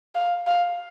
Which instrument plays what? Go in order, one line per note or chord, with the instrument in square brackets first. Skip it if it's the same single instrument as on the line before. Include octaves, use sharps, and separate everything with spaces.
[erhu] F5
F5